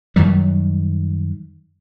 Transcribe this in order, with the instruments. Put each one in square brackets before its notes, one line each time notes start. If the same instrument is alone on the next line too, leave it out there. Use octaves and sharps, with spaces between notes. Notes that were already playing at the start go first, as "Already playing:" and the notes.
[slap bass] F#2 D#3 F#3 G3